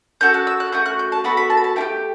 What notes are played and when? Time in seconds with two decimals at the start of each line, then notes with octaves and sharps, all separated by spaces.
0.21 C#4 F#4 A4 G6
0.34 F#6
0.47 E6
0.60 F#6
0.72 A3 C#4 F#4 G6
0.86 F#6
0.99 G6
1.12 A5
1.24 B3 F#4 A4 B5
1.37 B5
1.50 A5
1.57 B5
1.64 A5
1.76 A3 E4 G5
1.81 G4